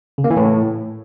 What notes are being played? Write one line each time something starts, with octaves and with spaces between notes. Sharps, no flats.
C#3
A#3
E3
A2